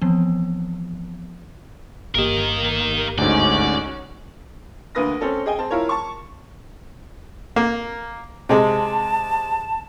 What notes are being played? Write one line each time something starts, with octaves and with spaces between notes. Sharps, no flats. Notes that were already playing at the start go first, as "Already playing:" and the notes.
E3 F3 B3 C4
G1 G2 A#3 G4 A#4 D#5
D2 G#2 C#4 D#4 F#4 D5
D2 A#3 B4 D#6 A#6
C4 C#4 A4
G#4 D#5 G5 G#5
C4 A5
E4 F4 A#4 C#5
A5 C#6
A#3
C3 G#3 A5